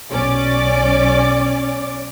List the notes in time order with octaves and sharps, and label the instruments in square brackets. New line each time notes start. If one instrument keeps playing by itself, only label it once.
[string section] B1 C#4 D5 D6